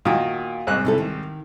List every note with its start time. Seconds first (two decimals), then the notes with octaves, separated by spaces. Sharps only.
0.05 A#2 D#3 A#3 F#4
0.67 C2 G#2 F#6
0.85 C3 E4 A4
0.98 D#3